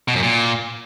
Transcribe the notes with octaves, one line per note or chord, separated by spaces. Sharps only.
B2
F#2
A#2